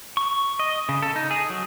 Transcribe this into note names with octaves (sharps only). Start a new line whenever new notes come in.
C#6
D#5
C#3
A4
D#4
G#4
F#3